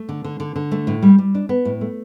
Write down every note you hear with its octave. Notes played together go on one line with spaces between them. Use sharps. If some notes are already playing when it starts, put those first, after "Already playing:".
Already playing: A3
D3
D3
D3
D3
A3
A2
G3
G3
D4
B3
A2
A3